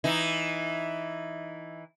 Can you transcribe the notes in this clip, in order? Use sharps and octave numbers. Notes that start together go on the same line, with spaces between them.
E3 D#4